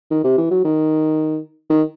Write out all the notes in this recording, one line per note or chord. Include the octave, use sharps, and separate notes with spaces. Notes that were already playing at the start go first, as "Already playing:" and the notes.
D#3
C3
E3
F#3
D#3
D#3